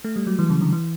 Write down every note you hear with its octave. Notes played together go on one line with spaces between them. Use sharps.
A3
G3
F#3
E3
C#3
D3
E3